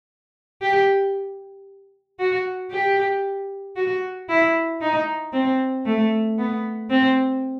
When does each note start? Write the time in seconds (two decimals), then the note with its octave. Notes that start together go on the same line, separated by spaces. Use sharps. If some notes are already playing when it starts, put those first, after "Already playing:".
0.62 G4
2.20 F#4
2.71 G4
3.76 F#4
4.29 E4
4.81 D#4
5.33 C4
5.86 A3
6.38 B3
6.90 C4